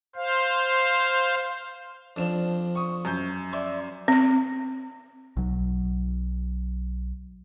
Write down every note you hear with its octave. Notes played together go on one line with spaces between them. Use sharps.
C5 F5
F2 F3 D4 E7
C#6 D#6
F#2 G6
D5 E5 C6
C4
B1 F#3